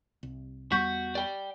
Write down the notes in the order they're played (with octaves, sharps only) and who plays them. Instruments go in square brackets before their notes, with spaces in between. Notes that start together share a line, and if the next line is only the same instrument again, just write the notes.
[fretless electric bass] C2
[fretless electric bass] E2 G3 B3 [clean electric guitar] F#4 [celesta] C#6 G6 B6
[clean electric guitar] D5 G5